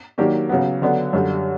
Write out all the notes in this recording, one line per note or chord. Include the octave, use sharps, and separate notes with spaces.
D#3 F#3 A#3 D4 G4
C#3 F#3 B3
D3 F#3 B3 D4
F#2 D3 G3